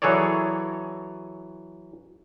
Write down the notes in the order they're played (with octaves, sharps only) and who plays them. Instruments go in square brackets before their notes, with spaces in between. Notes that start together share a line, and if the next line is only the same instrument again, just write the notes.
[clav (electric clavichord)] E3 F#3 G#4 A4 C#5 D5